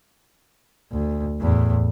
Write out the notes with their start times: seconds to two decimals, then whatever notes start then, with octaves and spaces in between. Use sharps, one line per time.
0.92 D2
1.41 E2 A2